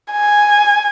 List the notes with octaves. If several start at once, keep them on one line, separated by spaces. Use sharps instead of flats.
G#5